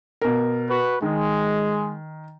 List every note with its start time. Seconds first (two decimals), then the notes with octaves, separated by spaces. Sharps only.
0.21 B2 A#4
0.70 F#4 B4
1.02 D#3 G#3